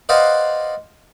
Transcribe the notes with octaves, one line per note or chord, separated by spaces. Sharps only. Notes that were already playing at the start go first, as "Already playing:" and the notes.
B4 C5 D5 D#5 F5 F#5